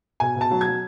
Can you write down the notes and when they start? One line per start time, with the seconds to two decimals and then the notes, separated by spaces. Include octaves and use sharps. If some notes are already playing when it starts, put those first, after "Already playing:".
0.20 B2 G#5
0.36 B2 A5
0.51 F#3
0.61 G#6
0.67 F#3